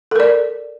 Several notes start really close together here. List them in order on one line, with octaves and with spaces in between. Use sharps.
A4 A#4 D5